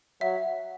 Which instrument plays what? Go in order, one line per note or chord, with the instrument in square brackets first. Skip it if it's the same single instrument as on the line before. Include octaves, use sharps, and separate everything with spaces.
[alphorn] F#3 [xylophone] E5